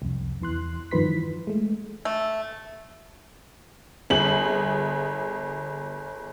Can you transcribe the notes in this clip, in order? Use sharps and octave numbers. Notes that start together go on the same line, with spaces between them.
C2 F2
E2 E3 C6 F#6
G2 D#3 F3 B4 C6 B6
E3
G#3 A3
A3
G1 G#4 F#7